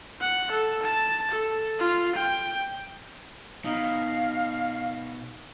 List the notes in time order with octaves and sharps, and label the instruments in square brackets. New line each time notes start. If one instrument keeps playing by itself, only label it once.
[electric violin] F#5
A4
A5
A4
F4
G5
[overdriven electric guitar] B2 [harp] D#4 [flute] F5